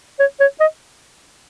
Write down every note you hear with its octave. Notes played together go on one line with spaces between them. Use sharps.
C#5
C#5
D#5